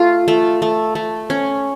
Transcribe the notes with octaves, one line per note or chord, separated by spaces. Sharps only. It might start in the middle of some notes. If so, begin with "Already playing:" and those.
Already playing: A3 F4
A3
A3
A3
C#4